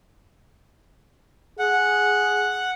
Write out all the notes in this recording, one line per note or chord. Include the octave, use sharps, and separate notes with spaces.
G#4 F#5